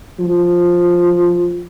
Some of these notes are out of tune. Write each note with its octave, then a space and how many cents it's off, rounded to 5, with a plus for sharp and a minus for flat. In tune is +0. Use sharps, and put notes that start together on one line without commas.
F3 +5